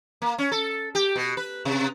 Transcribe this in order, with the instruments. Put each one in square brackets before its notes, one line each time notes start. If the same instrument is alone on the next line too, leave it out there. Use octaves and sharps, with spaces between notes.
[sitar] A#3
C#4
A4
G4
B2
B4
C3